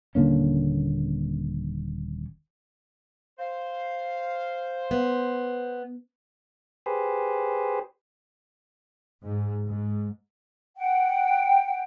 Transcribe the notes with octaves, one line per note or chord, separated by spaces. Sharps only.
D#1 D3 A#3 C#4
C5 F5
B3
G4 G#4 B4 C5
G#2
G#2
F#5 G5